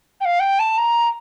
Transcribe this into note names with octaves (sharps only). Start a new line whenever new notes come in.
G5
F5
G5
A5
A#5